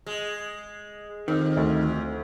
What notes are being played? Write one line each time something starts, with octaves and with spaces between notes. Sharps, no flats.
G#3
F2 D#3
D2